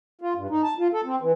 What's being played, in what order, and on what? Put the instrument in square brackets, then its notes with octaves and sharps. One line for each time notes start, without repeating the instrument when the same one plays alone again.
[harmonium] F4
G2
D#4
A5
F4
A4
C4
E3